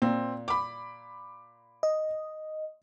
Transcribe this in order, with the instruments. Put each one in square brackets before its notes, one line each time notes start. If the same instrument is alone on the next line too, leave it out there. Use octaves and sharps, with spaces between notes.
[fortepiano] A#2 [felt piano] C4
[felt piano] B5 D6
[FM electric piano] D#5